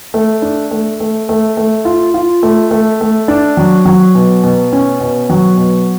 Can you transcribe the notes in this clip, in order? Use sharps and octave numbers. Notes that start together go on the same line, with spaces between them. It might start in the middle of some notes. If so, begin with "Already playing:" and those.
A3
D4
A3
A3
A3
A3
F4
F4
A3
A3
A3
D4
F#3
F#3
B2
B2
C#4
B2
F#3
B2